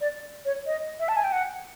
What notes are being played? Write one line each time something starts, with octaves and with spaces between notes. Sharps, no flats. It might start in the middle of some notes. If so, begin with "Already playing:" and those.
D5
C#5
D#5
E5
A5
G#5
G5
F#5